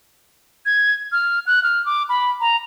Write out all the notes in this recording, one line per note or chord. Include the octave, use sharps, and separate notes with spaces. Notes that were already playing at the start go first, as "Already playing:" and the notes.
G#6
F6
F#6
F6
D6
B5
A#5